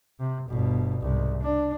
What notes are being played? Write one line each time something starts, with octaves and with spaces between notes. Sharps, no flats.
C3
G1 B2
C2 G#2
D4